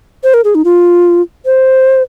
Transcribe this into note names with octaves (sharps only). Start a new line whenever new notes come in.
C5
A#4
G#4
D#4
F4
C5